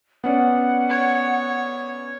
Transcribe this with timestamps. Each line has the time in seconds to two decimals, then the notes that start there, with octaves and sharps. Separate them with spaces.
0.24 B3 C#4 D5 F#5
0.90 C#5